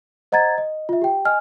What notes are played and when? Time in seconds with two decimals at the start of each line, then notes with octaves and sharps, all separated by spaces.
0.32 C5 D#5 F#5 A#5 G#6 A6
0.58 D#5
0.89 F4 E5
1.02 G4 G5
1.25 D#5 G#5 F6